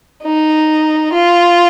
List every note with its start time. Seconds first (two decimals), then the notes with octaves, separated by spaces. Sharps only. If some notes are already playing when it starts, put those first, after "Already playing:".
0.23 D#4
1.12 F4